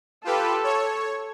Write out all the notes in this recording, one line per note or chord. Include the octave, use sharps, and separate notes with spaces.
F4 G4 A4 B4
C#5